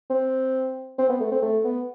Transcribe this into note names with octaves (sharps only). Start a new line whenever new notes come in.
C4
C4
B3
A3
C4
A3
B3